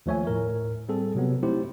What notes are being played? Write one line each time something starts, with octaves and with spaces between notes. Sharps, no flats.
D#2 F3 A3 C#5 E5 G#5
A2 A#4
G3 C4 G#4 A4
C3 F#3 B3
A3 C4 D#4 E4 G4 C5